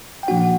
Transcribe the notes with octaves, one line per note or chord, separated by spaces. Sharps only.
G5
A#2 F3 A#3 D4 F#4 F#5